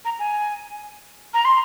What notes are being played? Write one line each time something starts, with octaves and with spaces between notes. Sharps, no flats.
A#5
G#5
A#5
C6